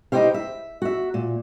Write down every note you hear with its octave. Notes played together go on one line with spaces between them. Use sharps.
D#4 E4 F#4 G4 C5 F5
E5
F#4 E5
A#2